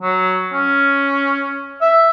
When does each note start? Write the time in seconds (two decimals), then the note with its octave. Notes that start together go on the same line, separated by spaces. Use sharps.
0.01 F#3
0.53 C#4
1.81 E5